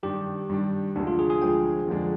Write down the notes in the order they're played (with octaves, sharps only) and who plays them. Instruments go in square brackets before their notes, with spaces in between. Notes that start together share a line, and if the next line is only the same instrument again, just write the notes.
[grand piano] G2 D#3 G3 D4 [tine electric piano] G4
[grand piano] G2 D#3 G3 D4
[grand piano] D2 C3 F3 G#3 [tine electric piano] D4
[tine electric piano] F4
G#4
G#4
[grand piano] D2 C3 F3 G#3 [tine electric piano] G5
[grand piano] F2 D3 F3 G#3 D4